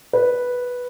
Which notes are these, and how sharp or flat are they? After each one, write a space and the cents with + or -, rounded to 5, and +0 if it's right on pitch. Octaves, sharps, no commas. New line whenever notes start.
B4 -5